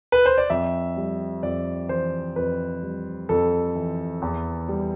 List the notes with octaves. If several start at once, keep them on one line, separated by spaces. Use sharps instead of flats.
B4
C5
D5
F2 E5
G3
F2 D5
E3 C5
F2 B4
G3
F2 A4
E3
E2
G3